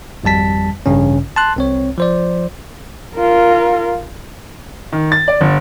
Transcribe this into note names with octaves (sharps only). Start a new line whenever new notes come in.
G#1 F2 G3 A5 B6
A1 G2 C#3 C#4
A5 C6 F#6
C2 C4 C#5
F3 C5 D5
F4 A#4
D#3
A6
D5
G1